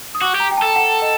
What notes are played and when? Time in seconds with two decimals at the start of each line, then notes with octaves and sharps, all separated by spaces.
0.15 D#6
0.21 F#4 D6
0.35 G4 A#5
0.51 G5
0.57 A5
0.62 A4
0.76 F#5
1.02 D#5